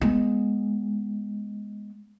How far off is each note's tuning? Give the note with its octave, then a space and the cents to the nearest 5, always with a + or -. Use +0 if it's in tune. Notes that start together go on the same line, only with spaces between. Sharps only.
G#3 +0 B3 +0